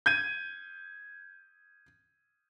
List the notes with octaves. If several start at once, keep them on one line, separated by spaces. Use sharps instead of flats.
G6 G#6 D#7